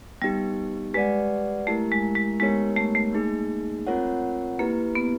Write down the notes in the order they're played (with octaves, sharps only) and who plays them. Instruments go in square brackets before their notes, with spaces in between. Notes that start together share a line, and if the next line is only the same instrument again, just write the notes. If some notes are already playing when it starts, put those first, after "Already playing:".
[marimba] G3 [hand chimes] B3 D#4 G4
[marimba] G#3 [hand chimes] G4 B4 D5 F#5
[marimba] A3 [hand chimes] E4 G4 A#4
[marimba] G#3
G#3
[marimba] G#3 [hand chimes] B3 D#4 G4 A#4 C#5
[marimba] A3
A3
[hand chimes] A#3 D#4 G#4
C4 F4 A#4 C#5 F#5
[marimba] A#3 [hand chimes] E4 G4 B4
[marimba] B3